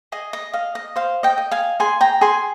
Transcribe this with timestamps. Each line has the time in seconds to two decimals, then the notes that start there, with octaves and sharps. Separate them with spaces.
0.12 G#4 D#5
0.33 D#5
0.53 D#5 F5
0.75 D#5
0.96 C5 F5
1.23 D#5 G5
1.38 D#5
1.51 F5 G#5
1.80 G#4 G#5 C6
2.01 G5 A#5
2.21 G#4 G#5 C6